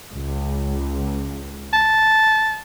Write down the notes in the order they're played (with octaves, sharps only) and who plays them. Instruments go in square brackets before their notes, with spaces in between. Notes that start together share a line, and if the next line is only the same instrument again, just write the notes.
[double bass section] C#2
[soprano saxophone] A5